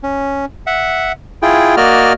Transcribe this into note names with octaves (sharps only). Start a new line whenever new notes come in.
C#4
E5 F#5
E4 F4 G#4 G5
A#3 F#4 D5 D#5 F6